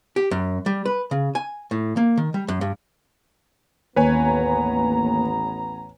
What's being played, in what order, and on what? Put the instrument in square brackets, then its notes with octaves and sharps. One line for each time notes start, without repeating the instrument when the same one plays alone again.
[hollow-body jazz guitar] G4
F#2
G3
B4
C#3
G#5
A2
A#3
D#3
G3
F#2
G2
[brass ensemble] A1 B3 A#5 [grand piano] D#2 [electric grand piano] B4 C#5 G#5